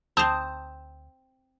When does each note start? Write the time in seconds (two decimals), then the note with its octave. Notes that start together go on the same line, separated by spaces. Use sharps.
0.17 D2 C4 C5 A5 D#6